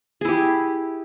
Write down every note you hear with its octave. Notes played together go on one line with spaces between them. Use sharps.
E4 G4 G#4